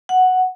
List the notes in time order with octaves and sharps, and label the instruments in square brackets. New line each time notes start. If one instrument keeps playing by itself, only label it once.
[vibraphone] F#5